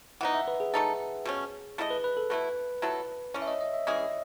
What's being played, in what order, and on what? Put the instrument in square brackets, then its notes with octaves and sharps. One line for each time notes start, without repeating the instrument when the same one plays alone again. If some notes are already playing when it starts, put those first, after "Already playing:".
[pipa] E3 B3 D#4 [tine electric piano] F#5
[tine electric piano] E5
B4
G#4
[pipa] A3 D#4 A4
B2 A3 C#4
A3 E4 A4 D#5
[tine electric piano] B4
B4
A4
[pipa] B2 A3 E4 [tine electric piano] B4
[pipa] F#3 A3 E4 A4
[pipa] E3 A3 C#4 [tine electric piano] C#5
[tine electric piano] E5
D#5
D#5
E5
[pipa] E3 G#3 C#4 G#4 [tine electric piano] D#5